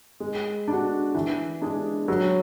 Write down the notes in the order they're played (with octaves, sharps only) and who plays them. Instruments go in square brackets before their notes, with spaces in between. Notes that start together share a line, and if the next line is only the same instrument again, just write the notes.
[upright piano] G#3
D4 F#4
E3
G#3 D4 G#4
F#3